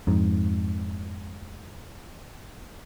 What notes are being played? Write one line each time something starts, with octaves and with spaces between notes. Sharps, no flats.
F2 G#2